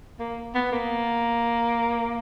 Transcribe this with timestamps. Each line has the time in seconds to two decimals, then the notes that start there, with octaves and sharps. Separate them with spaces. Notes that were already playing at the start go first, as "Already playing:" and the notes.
0.20 A#3
0.55 B3
0.73 A#3